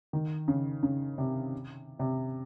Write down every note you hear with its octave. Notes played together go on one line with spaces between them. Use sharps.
D#3
C#3
C#3
C3
C3